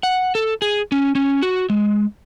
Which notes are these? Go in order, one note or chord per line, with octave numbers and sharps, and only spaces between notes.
F#5
A4
G#4
C#4
C#4
F#4
G#3